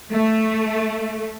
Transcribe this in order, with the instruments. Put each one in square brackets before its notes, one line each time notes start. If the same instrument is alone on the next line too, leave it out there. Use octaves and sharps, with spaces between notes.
[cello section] A3